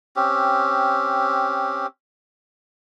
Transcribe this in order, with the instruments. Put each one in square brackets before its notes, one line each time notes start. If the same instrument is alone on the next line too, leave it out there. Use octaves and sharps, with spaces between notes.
[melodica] C4 C#4 G4